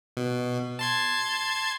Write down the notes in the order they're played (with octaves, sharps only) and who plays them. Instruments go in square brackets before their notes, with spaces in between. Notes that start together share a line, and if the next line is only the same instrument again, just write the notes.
[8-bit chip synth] B2
A5 C6 G#6